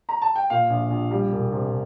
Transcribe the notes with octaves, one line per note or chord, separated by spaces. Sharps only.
A#5
A5
G5
A#2 F5
A#1
A#1
G3
E1
C3